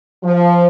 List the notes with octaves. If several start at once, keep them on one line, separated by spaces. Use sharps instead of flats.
F3